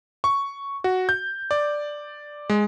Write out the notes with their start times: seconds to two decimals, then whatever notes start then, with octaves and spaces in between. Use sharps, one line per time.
0.24 C#6
0.84 F#4
1.09 G6
1.51 D5
2.49 G#3